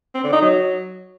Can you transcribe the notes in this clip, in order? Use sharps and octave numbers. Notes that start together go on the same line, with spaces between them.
C4
D3
D#4
F#3